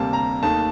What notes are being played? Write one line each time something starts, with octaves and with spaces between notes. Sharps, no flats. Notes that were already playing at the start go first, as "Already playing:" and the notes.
Already playing: D2 C3 G3 A#3 A5
A#5
D#2 D#3 A3 A5